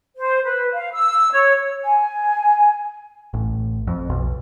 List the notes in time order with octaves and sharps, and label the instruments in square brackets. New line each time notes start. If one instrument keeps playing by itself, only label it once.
[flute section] C5
B4
F5
E6
C#5
[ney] G#5
[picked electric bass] A1
F2
B1